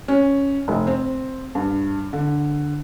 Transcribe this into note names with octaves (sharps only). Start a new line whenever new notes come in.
C#4
F1
C4
G2
D3